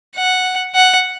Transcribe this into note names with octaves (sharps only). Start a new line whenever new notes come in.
F#5
F#5